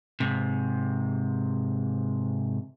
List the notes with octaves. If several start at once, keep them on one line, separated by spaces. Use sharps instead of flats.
G#2 C3